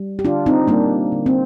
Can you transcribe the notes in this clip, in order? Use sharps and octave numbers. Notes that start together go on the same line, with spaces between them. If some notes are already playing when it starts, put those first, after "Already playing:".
Already playing: G3
G4
D3 D4 F4
C4 D#4
G3 A#3 D4
D3
C4